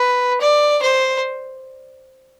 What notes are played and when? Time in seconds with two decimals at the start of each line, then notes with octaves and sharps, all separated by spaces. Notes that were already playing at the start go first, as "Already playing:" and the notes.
Already playing: B4
0.41 D5
0.82 C5